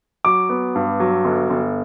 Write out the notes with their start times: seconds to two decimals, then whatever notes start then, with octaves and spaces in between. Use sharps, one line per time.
0.25 F#3 D6
0.49 B3
0.75 G2
1.00 F#3
1.25 G1
1.50 G1